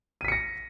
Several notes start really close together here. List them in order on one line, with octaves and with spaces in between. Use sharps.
D#7 B6 C#7 A#6